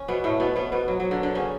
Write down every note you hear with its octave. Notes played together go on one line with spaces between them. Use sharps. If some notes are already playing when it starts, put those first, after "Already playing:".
Already playing: C#4
B2 B3
A2 A3
B2 B3
B2 B3
B2 B3
F#3
F#3
D3
D3
C#3 C#4